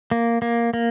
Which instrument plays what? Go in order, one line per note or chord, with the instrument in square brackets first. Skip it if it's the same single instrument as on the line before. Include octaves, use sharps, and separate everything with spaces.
[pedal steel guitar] A#3
A#3
A#3